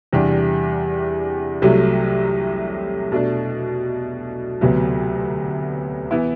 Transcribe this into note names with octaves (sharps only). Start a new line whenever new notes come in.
E2 C3 G3 D4 G4
C2 C3 F#3 A3
B2 A3 D4
D2 C3 F#3 B3
E3 B3 E4